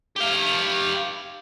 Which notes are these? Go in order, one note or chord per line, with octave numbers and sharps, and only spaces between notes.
G4 F5